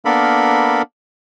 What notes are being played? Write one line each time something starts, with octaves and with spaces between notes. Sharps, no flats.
A#3 B3 D4 A4 A#4 B5